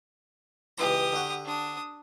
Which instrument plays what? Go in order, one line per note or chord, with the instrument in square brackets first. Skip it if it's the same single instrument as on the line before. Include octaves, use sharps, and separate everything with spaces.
[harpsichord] C#2 E3 A#5 [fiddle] G4 D#6
[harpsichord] D3 F#4
[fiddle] D4 D#6